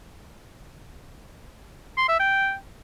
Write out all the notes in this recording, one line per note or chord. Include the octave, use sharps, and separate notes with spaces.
C6
E5
G5